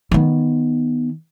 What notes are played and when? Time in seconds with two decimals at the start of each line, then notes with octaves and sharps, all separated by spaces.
0.11 D#3 B3